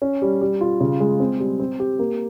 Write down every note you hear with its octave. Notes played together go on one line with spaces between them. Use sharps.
C#4
G3
G3
F4
C#3
G#3
C4
G3
C4
G4
A#3